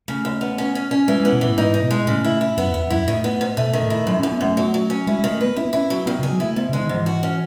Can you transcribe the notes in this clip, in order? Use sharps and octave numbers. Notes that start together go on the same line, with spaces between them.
C#3 A3
D#2
B3
C#4
C#4
C#4
E3 G#3
G#3
B3
B2
A2 E3
G#2 D#4
D#4
B2
G#3
A2 C#3
E4
E4
F#2 B3
E2 B3
F#2 E4
A2 D#3
B3
G#2
B2 A3
D#3
A2
E4
F#2 F#3
F#2 C#4
B3
F#2 A3
F#3
F#3
C#4
G#3 E4
G#3
D#3
A3
B3 B4
C#4 E4
B3
C#4 E4
F#3
D#3 B3
C#3
G#4
F#3
A3 E4
G#2 B3
C#3
G#3
D#3
G#2 E3
F#4
C#4